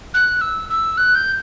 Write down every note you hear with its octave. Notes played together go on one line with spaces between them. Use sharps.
F#6
E6
E6
F#6
G6